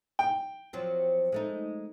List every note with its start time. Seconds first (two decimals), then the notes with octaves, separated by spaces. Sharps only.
0.19 G5
0.73 F3 F#3 C4
1.32 G#3 A3 D#4